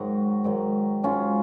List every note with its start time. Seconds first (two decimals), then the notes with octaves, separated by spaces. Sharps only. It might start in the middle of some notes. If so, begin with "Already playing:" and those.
Already playing: G#2 D#3 F#3 D#4 F#4
0.44 G#2 D#3 F#3
1.03 G#2 F#3 C#4 F4